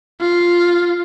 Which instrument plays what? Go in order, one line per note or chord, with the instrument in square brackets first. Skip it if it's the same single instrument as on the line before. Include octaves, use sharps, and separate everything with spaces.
[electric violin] F4